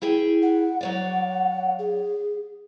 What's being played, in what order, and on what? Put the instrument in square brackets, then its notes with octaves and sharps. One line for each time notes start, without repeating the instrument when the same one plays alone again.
[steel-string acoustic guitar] E4 G#4 G5
[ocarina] F#5
[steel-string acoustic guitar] F#3 C#5 D5 [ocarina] F#5
[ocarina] G#4